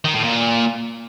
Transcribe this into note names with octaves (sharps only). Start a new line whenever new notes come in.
D#3
A2
A#2